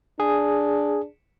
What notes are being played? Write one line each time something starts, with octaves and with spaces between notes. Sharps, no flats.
D4 G#4